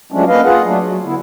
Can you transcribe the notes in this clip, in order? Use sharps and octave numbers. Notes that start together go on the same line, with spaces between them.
F3 F#3 G#3 A3 C#4 D4
A#3 B4 D#5 F5
F4 G#4 F#5
F#3 A3 D4
F#3
D3 B3 E4